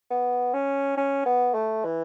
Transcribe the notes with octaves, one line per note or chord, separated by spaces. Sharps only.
B3
C#4
C#4
B3
A3
E3